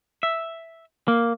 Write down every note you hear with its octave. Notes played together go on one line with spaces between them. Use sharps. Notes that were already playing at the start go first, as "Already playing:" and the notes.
E5
A#3